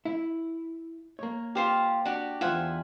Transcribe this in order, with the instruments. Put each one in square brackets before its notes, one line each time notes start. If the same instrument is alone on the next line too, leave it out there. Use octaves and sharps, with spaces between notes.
[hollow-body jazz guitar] E4
A#3 C#5
[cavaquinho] F4 C5 F5 [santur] G4
[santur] D4 [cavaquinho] F#4 G4
[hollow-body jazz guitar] E2 F4 [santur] C5 [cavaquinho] E5 F#5 G#5